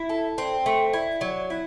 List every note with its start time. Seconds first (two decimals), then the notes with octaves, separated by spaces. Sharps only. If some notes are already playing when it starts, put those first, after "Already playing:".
Already playing: E4
0.09 A4
0.38 C4
0.66 A3
0.93 E4
1.21 F#3
1.50 E4